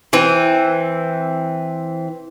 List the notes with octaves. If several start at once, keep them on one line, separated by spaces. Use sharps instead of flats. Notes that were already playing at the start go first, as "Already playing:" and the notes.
E3 C4